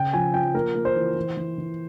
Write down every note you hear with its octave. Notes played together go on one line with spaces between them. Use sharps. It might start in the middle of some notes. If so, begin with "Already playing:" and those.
Already playing: C#3 G5
F3 G#5
F3 G5
A#3 A#4
A#3
C5
E3
E3
E3
E3